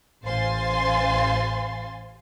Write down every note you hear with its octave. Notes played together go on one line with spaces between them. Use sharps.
A1 C5 F5 G#5 C6 A6